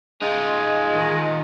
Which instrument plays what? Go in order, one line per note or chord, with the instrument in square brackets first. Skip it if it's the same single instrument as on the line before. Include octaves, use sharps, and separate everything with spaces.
[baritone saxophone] G#3 [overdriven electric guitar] D#4 F4
[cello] D#3